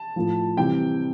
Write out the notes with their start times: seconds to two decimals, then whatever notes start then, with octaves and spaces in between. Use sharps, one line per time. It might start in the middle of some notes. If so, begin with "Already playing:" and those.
Already playing: A5
0.16 A2 F3
0.57 C3 E3 G3 G5